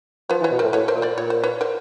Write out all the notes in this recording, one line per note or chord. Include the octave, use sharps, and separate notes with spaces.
F3 B4 C#5
E3
B4 C#5
B2
A2 A#4 C5
A2 B4 C#5
A#4 C5
A#2
C5 D5
A#2 C#5
C5
B4 C#5
A#4 C5